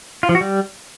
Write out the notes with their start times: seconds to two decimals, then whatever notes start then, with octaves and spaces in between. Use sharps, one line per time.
0.23 F4
0.29 F3
0.35 F#4
0.41 G3